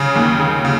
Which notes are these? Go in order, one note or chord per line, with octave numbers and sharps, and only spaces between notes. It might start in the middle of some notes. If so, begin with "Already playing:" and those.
Already playing: C#3 D#6
D#2
C#3
C#3